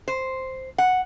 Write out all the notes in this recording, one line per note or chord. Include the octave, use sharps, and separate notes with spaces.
C5
F#5